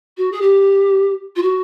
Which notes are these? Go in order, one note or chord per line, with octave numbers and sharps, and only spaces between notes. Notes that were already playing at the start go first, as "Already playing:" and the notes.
F#4
G#4
G4
F4
F#4